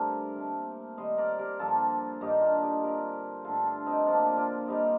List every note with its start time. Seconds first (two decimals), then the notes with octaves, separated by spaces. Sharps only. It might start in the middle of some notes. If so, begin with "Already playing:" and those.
Already playing: G2 D3 A3 C4 G4 A#4
0.36 A#2 A3 C4
0.97 C3 D#3 G3 C5 D#5
1.18 A#4 D5
1.39 G4 A#4
1.59 G2 F3 A#3 F4 A4
2.21 G2 D#3 A#3 D#4 G4
2.41 D4 F4
2.62 D#4 G4
2.83 D3 G3 C4 G4 A#4
3.44 G2 D3 A3 F4 A4
3.65 D4 F4
3.86 C4 D#4
4.06 D3 F3 A#3 D4 F4
4.37 D4 F4
4.68 C3 G3 A#3 D#4 G4